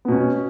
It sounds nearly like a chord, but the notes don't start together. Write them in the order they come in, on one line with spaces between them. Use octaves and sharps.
B3 B2 C#4